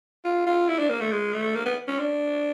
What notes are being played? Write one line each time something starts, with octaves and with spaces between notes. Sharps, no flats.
F4
F4
E4
D4
A#3
A3
G#3
A3
A#3
B3
C#4
D4